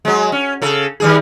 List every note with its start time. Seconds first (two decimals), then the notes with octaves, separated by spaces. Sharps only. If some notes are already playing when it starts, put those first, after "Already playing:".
0.05 F#3 G#3
0.32 C#4
0.62 C#3 A4
1.00 D#3 G3 G#4